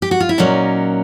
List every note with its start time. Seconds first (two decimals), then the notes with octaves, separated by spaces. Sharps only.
0.02 G4
0.11 F#4
0.20 F4
0.29 E4
0.38 A#2 F#3 A#3 C#4 D#4